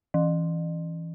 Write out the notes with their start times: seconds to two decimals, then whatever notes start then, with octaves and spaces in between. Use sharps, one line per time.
0.14 E3